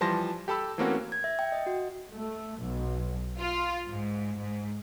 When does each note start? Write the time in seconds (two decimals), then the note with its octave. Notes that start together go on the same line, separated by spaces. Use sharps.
0.01 E3 F3 G3 A5 C6 A#6
0.48 G4 A4 A5 B5 E6
0.78 E3 A3 A#3 C4 C#4 F#4
1.12 G#6
1.24 E5
1.39 G5
1.52 D#5
1.66 F#4
2.13 A3
2.58 B1
3.39 F4
3.88 G#2
4.39 G#2